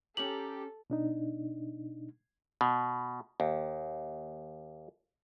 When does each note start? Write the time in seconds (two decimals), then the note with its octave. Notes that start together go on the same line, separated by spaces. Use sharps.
0.17 C#4 G4 A4 A#5 F#7
0.90 B2 D4 D#4
2.61 B2
3.40 D#2